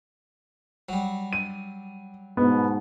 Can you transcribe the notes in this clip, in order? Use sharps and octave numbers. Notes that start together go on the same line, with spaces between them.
F#3 G3
D#7
G#2 B2 B3